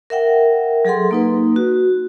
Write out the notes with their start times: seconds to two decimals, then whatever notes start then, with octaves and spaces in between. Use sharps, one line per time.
0.10 A#4 E5 F#5 G5
0.85 F#3 G#4 A4 F#5 C6
1.11 A#3 D#4 B4
1.56 F#4